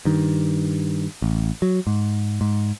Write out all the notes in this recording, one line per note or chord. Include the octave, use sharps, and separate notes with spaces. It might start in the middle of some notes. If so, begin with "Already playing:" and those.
G2 D#3
A1
F#3
G#2
G#2